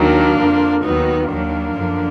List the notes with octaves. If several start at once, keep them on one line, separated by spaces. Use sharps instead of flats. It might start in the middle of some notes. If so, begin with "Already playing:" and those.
Already playing: D#2 D#3 F#3 A#3 D4
F2 D3 F3
D#2 D#3 F#3 B3 D#4
D#2 D#3 F#3 A#3 D4
F#2 D3 F3